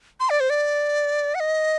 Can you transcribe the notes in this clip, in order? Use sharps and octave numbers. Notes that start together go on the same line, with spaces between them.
C6
D5
C5
D5
F#5
D#5